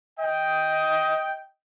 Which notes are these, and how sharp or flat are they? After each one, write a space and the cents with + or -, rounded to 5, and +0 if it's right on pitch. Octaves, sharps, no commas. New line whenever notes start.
D#5 +15 G5 +0